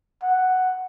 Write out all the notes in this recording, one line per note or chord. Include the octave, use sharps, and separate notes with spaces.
F#5